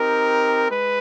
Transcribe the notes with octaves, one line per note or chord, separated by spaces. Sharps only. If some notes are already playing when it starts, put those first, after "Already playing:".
Already playing: C4 D#4 G4 A#4
G#3 B4